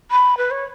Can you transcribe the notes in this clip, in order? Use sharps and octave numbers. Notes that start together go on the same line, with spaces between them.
B5
B4
C#5